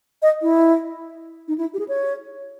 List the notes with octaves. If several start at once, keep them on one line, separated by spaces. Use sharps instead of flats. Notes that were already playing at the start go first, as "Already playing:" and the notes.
D#5
E4
D#4
E4
G4
G#4
C#5